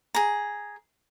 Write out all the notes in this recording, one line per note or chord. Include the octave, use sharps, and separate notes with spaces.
G#4 A#5